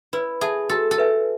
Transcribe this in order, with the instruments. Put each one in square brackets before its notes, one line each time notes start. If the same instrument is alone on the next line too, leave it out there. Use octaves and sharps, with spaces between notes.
[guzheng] E4 [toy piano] B4
[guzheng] G#4 [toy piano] E5 A5
[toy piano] F#4 [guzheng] A4
[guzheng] A4
[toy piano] B4 E5 G#5